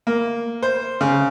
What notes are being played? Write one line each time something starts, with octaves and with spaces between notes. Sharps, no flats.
A#3
C5
C#3